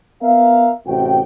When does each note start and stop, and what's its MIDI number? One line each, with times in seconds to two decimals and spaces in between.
0.22 0.72 59
0.22 0.72 70
0.22 0.72 76
0.22 0.72 77
0.87 1.21 33
0.87 1.21 48
0.87 1.21 66
0.87 1.21 79